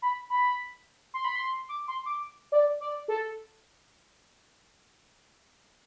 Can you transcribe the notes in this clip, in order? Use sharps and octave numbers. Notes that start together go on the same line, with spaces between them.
B5
B5
C6
B5
C6
D6
C6
D6
D5
D5
A4